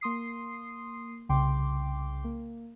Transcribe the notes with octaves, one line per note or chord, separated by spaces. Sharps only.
A#3 C6 D#6 C7
C2 C#3 G5 C6 D6
A#3